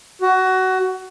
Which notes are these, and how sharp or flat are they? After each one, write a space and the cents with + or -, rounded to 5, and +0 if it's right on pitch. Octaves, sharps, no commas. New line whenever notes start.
F#4 +20